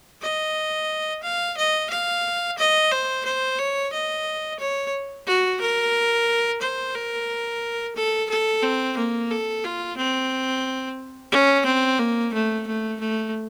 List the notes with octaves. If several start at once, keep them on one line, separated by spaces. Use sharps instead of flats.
D#5
F5
D#5
F5
D#5
C5
C5
C#5
D#5
C#5
F#4
A#4
C5
A#4
A4
A4
C4
A#3
A4
F4
C4
C#4
C4
A#3
A3
A3
A3